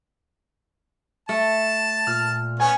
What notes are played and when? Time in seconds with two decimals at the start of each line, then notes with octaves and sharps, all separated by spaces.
1.29 A3 A5
2.07 A#2 F6
2.60 B3 C#4 G#5